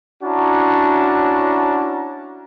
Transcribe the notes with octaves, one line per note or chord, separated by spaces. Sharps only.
C#4 D4 E4 F#4 A5 A#5